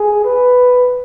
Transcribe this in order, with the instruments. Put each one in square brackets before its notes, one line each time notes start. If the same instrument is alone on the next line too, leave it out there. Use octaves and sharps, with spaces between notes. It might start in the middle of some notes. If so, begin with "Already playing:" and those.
Already playing: [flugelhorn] G#4
B4